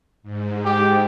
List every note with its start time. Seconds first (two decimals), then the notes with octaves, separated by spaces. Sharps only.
0.23 G#2
0.65 G4